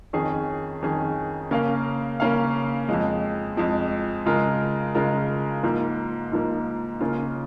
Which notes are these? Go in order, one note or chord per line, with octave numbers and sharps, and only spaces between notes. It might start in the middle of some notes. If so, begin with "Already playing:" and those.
F2 D#3 C#4 G#4
F2 D#3 C#4 G#4
C#3 A#3 C#4 A#4 F5
C#3 A#3 C#4 A#4 F5
F2 F3 G#3
F2 F3 G#3
C#3 G#3 F4 A#4
C#3 G#3 F4 A#4
G#2 F3 A#3
G#2 F3 A#3
C#3 A#3 C#4 F4